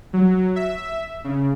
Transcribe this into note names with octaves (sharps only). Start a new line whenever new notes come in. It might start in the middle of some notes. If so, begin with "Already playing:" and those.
F#3
E5
C#3